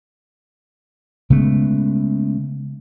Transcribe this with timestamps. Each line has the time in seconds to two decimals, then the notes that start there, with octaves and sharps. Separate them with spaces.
1.30 C#3 G#3 A3 B3